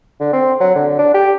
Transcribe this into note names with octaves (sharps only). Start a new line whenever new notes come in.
D3
C4
F#3
D3
D4
G4